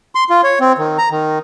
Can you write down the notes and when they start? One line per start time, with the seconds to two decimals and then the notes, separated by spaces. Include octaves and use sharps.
0.15 C6
0.30 F4
0.44 C#5
0.60 C4
0.78 D#3
0.98 A#5
1.11 D#3